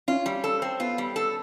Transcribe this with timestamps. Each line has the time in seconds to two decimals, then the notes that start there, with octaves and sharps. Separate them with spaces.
0.08 C#4 F4
0.26 G3
0.44 A4
0.62 C4
0.80 B3 F4
0.98 G3
1.16 A4